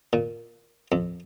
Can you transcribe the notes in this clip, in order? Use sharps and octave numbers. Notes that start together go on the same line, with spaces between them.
A#2
F2